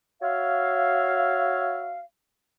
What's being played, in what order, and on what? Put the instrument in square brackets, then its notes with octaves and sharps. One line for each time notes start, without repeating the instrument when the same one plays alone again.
[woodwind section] F#4 C#5 E5 F5